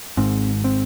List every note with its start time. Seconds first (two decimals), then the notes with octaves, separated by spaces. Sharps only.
0.17 G#1 G#2 C4
0.64 C4